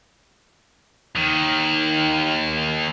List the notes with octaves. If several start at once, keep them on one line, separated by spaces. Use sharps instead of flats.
D#2 D#3